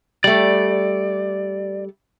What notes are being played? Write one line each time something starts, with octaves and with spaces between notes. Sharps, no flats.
G3 A3 D5